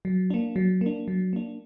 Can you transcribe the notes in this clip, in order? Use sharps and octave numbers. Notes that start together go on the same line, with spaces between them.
F#3
A#3 D4
F#3
A#3 D4
F#3
A#3 D4